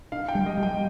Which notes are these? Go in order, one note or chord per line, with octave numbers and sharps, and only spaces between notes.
D4 F5
G5
G3
D#5
G3
G5